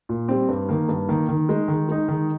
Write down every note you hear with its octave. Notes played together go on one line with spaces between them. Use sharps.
A#2
G3 C4
G2
D#3 A#3
G2
D#3 A#3
D#3
G#3 D#4
D#3
G#3 D#4
D#3